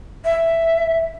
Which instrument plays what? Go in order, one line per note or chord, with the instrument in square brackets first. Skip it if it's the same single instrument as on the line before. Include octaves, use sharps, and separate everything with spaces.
[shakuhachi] E5